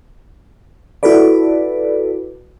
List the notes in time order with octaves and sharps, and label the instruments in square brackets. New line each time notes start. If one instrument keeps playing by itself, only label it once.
[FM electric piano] E4 F#4 A4 B4 D5